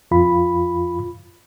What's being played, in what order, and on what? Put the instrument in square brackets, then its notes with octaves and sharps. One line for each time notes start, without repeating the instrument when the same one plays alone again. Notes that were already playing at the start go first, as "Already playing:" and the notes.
[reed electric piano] F2 F4 B5